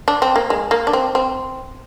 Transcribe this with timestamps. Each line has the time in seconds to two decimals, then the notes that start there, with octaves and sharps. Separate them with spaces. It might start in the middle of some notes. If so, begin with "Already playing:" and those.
0.08 D4
0.22 C4
0.36 A#3
0.50 G#3
0.71 A#3
0.87 D4
0.93 C4
1.15 C4